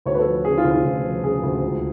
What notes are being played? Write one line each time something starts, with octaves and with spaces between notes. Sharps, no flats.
D2 C#5
B4
A4
F3
C#3 G#4
F4
D2
F4
D2
F3
C#3 G#4
D2
C#2